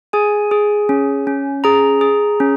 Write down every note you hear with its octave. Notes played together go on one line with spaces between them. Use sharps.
G#4 G#5
G#4
C#4
C#4
G#4 A#5
G#4
C#4